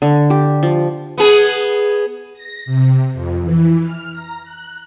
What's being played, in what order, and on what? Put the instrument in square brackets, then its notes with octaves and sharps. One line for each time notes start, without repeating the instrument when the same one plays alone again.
[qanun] D3
G4
F3
[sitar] B3 G#4
[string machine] A#6
C3
F2
E3
F6
A#5
F#6